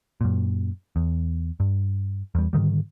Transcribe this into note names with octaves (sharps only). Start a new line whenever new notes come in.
F#2 A#2
E2
G2
E2 G3
G#2 D3 D#3 G3